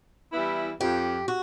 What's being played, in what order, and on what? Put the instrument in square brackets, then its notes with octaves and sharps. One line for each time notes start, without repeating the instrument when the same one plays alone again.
[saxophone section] E3 G3 B3 E4
[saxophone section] F2 [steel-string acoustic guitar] G4
[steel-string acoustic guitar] F#4